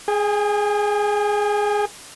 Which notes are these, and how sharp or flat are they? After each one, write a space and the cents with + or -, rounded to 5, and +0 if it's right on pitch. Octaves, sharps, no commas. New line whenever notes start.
G#4 +5 G#5 -45